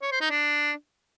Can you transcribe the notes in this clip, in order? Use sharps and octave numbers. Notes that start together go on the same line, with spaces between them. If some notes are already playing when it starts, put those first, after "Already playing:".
C#5
C5
D#4
D4